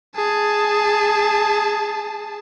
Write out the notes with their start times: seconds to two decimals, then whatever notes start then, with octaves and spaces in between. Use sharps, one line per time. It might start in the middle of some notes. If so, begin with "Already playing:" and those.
0.16 G#4 A5